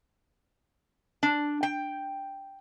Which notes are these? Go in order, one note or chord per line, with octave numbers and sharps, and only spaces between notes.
D4
G5